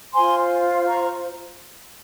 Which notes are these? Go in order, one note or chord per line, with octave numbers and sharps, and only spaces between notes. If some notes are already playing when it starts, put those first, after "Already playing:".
F4 C5 G#5 C6
A#5 C#6